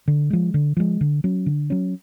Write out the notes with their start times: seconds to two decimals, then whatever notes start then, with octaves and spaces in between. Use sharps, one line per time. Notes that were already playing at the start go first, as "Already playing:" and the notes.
0.08 D3
0.30 F3 G#3
0.54 D3
0.77 F3 G#3
1.01 D3
1.24 F#3 C#4
1.46 D3
1.70 F#3 C#4